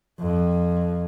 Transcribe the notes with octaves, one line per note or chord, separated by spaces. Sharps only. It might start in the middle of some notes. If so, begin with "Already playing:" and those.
F2